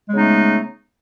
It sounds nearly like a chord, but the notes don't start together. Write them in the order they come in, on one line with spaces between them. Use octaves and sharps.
G#3 C#3 B3 D#4 A3